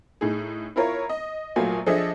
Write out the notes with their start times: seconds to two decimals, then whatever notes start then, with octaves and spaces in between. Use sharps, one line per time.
0.21 A2 D#4 G#4
0.76 E4 F4 A#4 C#5
1.09 D#5
1.56 A#1 A#2 F#3 A3 F4 G#5
1.86 F3 D4 G#4 A4 D#5 E5